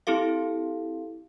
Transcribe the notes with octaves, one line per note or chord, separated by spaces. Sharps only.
C4 E4 G4 A4 F5